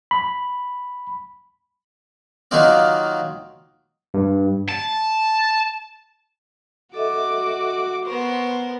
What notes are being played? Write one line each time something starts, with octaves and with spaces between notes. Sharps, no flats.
B5
D#3 F#3 A#3 D#4 F4 D5
G2
A5
F#4 A4 D#5 E5 D6
B3 A#4 C5 C#6